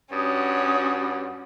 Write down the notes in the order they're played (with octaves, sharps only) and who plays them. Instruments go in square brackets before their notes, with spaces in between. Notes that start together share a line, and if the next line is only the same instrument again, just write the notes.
[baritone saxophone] G2 [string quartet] C#4 F#4 [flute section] D#6